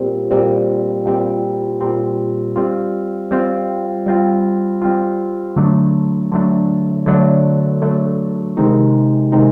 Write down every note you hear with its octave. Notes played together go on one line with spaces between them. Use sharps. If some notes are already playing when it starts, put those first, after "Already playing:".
Already playing: A#2 G3 C4
A#2 G3 C4
A#2 G3 C4
A#2 G3 C4
G3 C4 F4
G3 C4 F4
G3 C4 F4
G3 C4 F4
D3 F#3 A3 D4
D3 F#3 A3 D4
D3 F#3 A3 D4
D3 F#3 A3 D4
C3 D#3 G#3 C4 D#4
C3 D#3 G#3 C4 D#4